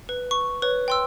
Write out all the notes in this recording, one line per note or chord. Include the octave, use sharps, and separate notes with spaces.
B4
C#6
B4 C#5
G5 C6 E6